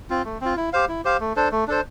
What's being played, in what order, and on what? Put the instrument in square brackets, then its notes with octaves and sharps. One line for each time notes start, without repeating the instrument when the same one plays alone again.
[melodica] C4 F4
A3
C4 F4
E4
G4 C5 F5
E4
G4 C5 F5
A3
D4 A4 C5
A3
D4 A4 C5